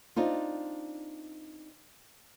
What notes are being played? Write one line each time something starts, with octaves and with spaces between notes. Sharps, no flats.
C4 D4 D#4 F4